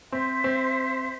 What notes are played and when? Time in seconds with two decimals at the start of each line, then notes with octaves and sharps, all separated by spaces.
0.12 C4 C5 E5 C6
0.44 C4